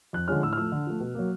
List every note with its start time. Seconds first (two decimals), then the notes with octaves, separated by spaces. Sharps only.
0.13 F2 F#6
0.28 D3 F3 G#3 C#4 F6
0.43 A2 E6
0.53 F6
0.57 F3 A3 E6
0.72 D3
0.87 F3 A3
1.00 B2
1.15 F#3 A#3